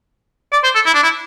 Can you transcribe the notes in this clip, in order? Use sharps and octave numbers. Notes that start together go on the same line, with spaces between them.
D5
C5
A4
E4
D4
E4